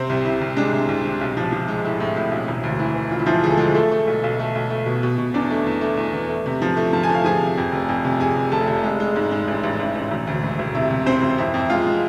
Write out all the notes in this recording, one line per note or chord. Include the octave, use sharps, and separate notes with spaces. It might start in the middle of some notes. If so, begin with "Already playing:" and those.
Already playing: C3 C4 C5
C2
C3 E4
C2
G#3 D4
C2
C2
C3
B1
F3
F3
G#3
A2 E4
A2
A2 E4
B1
E1 E4
D2
E3 E4
E3
D2 F4
E4
E3 F3 F4
D2 G#4
A4
D2 G#3 G#4
A3 A4
A3
B1
B1
A3
B1
A3
B2
B2
B2
E2 D4 D5
A3
E2
A3
E2
E2
A3
C3
F3
A3
F3 A5
G#5
A3
F5
F3 G#4 G#5
C3
F2
F1
F2
C3
F2 G#4 G#5
F1
F1 A4 A5
F1
G#3
G#3
G#2
G#3
A1
A1
A1
A1
E1
D2
E1
E1
C3 E4 E5
C3
E1 C4 C5
E1
F2 E4 E5
F2
E5
G#3 F4 F5
G#3